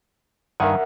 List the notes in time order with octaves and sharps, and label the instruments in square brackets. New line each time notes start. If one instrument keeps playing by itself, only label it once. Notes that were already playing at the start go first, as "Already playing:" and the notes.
[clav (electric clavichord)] G2 D#3 G#5 [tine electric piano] A#4 E5 F#5